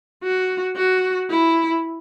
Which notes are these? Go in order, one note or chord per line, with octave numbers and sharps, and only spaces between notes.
F#4
F#4
E4